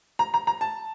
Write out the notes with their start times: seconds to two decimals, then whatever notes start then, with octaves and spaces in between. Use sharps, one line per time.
0.19 A#5
0.34 A#5
0.47 A#5
0.61 A5